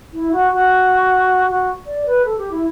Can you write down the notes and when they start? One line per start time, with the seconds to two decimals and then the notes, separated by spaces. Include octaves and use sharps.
0.13 E4
0.32 F#4
0.51 F#4
1.47 F#4
1.86 D5
2.06 B4
2.25 A4
2.37 G4
2.51 E4